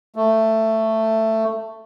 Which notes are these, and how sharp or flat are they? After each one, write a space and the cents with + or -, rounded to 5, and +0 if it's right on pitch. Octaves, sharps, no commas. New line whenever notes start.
A3 +10